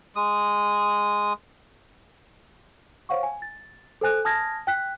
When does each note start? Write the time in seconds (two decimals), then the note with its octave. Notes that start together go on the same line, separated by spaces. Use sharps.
0.16 G#3 D#6
3.09 C5 C#5 F5 F#5 C#6
3.23 G#5
3.42 A6
4.01 A4 C5 G#5 F#6
4.25 G#5 A5 D#6 F6 G#6 A#6
4.67 G5 F#6 B6